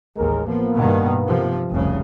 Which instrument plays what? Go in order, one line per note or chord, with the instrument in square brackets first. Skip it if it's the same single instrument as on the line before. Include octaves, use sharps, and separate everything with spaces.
[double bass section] A1 D#2 [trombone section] G#3 A#4
[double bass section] F3 [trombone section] A#3 B3
[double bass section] G2 B2 D#3
C3 F3
F1 C2 C#3